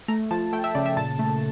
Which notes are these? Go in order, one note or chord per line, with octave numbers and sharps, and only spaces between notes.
A3 A#5
F3 A5
A3 G5
E5
C#3 D5
E5
A#2 A5
A3